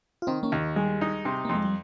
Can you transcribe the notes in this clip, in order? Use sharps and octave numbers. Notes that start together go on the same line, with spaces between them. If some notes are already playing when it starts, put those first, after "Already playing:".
F4
D#3 C4 D#4
A#3 C#4
D#2
G3 G#3
D#4
C3
F2 A#3
G#3
G3